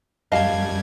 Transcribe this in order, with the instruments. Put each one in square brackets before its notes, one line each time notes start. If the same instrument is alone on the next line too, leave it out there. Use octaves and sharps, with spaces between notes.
[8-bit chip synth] F#2 G3 G#6 [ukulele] D#5 F5 A5